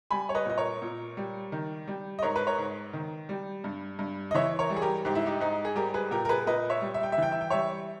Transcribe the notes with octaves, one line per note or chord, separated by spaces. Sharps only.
G3 G#5 B5
C#5
B4 D#5
A#2 D#5
A#4 C#5
A#2
G3
D#3
G3
D#5
G#2 A#4 C#5
B4
A#4 C#5
G#2
D#3
G3
G2
G2
D#5
E3 C#5 E5
A#4 C#5
G3
G#4
G4 A#4
G#2 G4
E4
D#4 G4
G#2 D#4
G#4
G3 G4 A#4
G#4 B4
A#2 G4 A#4
A#4
G#4 B4
A#2 B4 D#5
C#5 E5
G3
E5
G5
E5
E3 G5
E5
G5
G3 C#5 E5